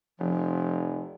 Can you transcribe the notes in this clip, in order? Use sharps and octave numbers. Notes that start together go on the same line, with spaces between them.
F1 F3